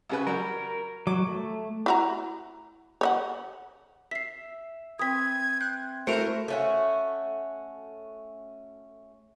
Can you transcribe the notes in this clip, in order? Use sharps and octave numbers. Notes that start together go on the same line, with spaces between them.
C2 C#3 B4
F#3 G3 A#4
F#3 D6
A3
E4 F#4 A#5
C#5 D#5 F#5
E5 B6 C7
C4 B4 D#6 G#6 B6
F#6 G6
A3 E4 F#4 A#4 C5 C#7 D7 F7
A3 C#4 F#4